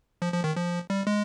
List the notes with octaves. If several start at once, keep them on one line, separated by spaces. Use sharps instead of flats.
F3
F3
D#3
F3
G3
G#3